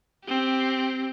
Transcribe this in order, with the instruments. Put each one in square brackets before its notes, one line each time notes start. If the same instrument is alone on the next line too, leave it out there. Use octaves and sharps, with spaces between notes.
[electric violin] C4 G4